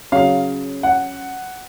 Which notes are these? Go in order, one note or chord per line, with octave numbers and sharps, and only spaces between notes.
C#3 F#3 F5
F#5